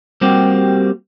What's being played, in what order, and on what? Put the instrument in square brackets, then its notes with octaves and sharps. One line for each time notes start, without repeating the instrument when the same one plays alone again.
[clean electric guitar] G3 A#3 C4 F#4 G4